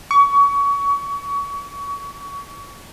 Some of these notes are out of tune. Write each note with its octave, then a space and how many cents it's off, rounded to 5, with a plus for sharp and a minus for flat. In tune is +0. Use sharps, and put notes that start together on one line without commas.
C#6 +30